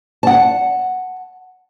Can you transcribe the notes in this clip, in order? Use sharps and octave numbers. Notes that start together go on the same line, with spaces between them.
F#5 A5